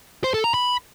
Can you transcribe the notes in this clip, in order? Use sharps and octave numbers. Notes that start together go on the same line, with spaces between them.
C5
A4
A#5
B5